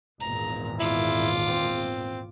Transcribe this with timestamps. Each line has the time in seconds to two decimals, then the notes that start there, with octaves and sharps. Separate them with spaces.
0.20 G#1 E2 A#2 A#5
0.79 E4 F4 D6
1.48 C4